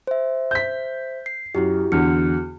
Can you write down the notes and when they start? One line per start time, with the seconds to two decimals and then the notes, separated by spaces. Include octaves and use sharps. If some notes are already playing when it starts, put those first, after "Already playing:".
0.07 C5 E5
0.51 G6 B6
1.26 C7
1.55 F#2 E4 F#4 G4
1.92 E2 D3 F#4 F6 C#7